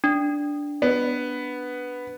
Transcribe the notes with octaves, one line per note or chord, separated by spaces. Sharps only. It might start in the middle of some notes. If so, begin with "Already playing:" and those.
D4
B3